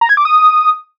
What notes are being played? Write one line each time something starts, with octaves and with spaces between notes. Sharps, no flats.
A#5
G#6
D6
D#6